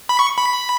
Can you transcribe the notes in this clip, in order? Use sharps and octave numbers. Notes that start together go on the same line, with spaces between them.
B5
C#6
B5